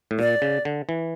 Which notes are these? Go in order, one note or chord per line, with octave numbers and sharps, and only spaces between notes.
A2
A#2 D5
C#3
D3
E3